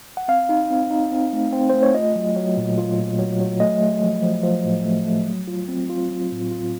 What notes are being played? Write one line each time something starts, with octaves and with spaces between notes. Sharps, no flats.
F#5
C4 F5
D#4
C4
D#4
C4
A3
C4
A3 C5
C#5
F4 D#5
F#3
F#3
A#2
F4
A#2
F#3
F#3
A3 D#5
A3
F3
F3
F3
A2
A3
A3
F#3
F4
C4
F4
F#3
A2
F4